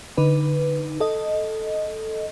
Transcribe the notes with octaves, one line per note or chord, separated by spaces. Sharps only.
D3 D#4 B4
A4 D#5